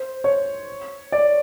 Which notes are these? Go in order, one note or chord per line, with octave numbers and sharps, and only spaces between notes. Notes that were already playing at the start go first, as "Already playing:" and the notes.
Already playing: C5
C#5
D5